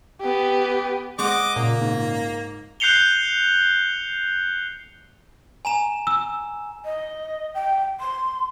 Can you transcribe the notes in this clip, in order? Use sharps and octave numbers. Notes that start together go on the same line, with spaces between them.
B3 G4
G#3 C5 D#5 F#5 D6
A#2 C#3 A#3
G#2
F#6 G6 C7 C#7 F7 G7
G#5 A#5 E7
E6
D#5
G5
C6